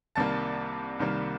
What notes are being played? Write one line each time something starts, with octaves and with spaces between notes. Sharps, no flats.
C2 C3 D#3 G3 A#3 A5 A6
C2 C3 D#3 G3 A#3